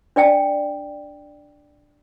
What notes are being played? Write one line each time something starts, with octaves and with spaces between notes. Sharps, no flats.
D4 D5 G5 A5